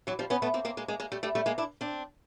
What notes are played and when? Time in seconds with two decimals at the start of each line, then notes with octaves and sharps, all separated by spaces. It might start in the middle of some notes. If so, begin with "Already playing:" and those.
0.07 E3 F#3
0.19 F3 G3
0.30 B3 C#4
0.42 A3 B3
0.54 A#3 C4
0.65 A#3 C4
0.77 G#3 A#3
0.88 G#3 A#3
1.00 G#3 A#3
1.12 G3 A3
1.23 G3 A3
1.35 G3 A3
1.46 G#3 A#3
1.58 D4 E4
1.81 C4 D4